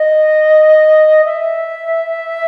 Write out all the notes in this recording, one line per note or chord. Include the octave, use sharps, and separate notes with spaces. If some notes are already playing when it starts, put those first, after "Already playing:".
Already playing: D#5
E5